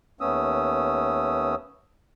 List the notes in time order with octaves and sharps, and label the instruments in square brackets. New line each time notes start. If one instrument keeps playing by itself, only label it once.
[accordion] D#2 A3 B3 C#4 D#6 E6